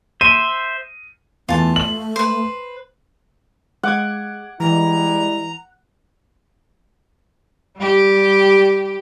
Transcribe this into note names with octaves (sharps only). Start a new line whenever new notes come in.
C5 E5 D#7
E2 A3 F4 A5
F#7
B4 C5
G#3 F#5 D6 G#6
E3 G3 G#3 E4 A#5
G3 G4